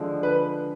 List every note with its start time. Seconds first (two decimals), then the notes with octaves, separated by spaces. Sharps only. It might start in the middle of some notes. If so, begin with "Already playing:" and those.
Already playing: D3 F3 G#3
0.23 B4